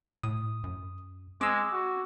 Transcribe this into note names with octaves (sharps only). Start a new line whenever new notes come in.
A2 D#6
F#2
G#3 C4 D6 E6
F#4